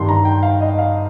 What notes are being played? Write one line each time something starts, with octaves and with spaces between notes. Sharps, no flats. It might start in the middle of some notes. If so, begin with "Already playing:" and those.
Already playing: G2 D#3 C6
A#5
G5
F5
D#5
F5